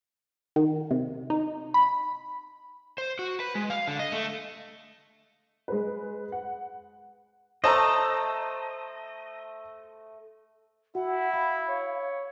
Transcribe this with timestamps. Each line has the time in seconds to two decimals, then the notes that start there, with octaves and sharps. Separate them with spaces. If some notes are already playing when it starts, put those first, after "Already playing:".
0.56 D#3
0.91 C3
1.30 D#4
1.74 B5
2.98 C5
3.19 F#4
3.40 B4
3.55 G#3
3.70 F5
3.87 D3
3.99 D#5
4.12 A3
5.68 G#3 B4
6.32 F#5
7.64 A3 C5 D#5 A5 A#5 E6
10.95 E4 F#4 F#5
11.33 F5 B5
11.68 C#5